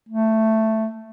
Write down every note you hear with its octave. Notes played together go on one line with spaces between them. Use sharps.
A3